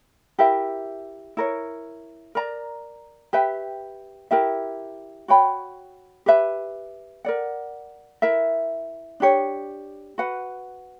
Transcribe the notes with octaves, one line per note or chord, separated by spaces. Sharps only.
E4 G4 A#4 E5
E4 A#4 C#5
A#4 D5 A#5
G4 B4 E5 G5
E4 G4 A#4 E5
F#4 C#5 G5 B5
G4 B4 E5
A#4 D5 F#5
E4 A#4 E5
D4 G4 C#5
F#4 B4 F#5